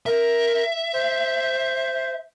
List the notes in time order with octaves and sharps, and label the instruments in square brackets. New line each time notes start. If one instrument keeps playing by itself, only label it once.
[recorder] A#4 [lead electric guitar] E5
[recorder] C5